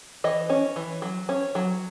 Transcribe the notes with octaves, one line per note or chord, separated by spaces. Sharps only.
E3 D#5
C#4
E3
F#3
C#4
F#3